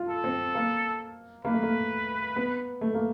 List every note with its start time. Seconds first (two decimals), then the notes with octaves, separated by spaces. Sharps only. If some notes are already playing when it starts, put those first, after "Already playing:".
Already playing: F4
0.09 A4
0.24 C4
0.55 A#3
1.45 A#3 B4
1.54 A3
1.63 A#3
2.36 B3
2.81 A3
2.94 A#3